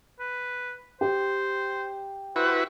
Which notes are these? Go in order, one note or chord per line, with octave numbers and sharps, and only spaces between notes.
B4
G4 C5
E4 F#4 B4 C5